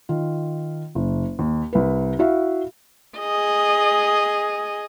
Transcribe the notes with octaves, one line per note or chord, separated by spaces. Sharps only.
D#3 F4
F#1
D#2
C2 B4
E4 F#4 E5 F5
G#4 D#5